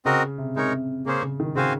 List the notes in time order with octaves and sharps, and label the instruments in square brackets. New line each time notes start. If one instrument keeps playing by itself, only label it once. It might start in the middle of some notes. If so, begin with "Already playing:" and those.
[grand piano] C#3 [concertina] C4 F#4 A#4 D#5
[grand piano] C3
[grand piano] C3 [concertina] G#3 D#4 A#4 C#5
[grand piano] C#3 [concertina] A#3 C#4 G#4 C5
[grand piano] C#3
D#3
[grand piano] C#3 [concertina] C4 F#4 C5 F5 G#5